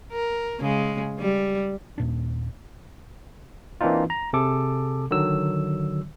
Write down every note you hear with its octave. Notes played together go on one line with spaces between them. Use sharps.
A#4
C#3 G#3
G3
D#2 A#2 D4
E3 A#3 C4 D4 D#4 F4
A#5
C3 G#4 A4 D6
D3 D#3 F#3 E6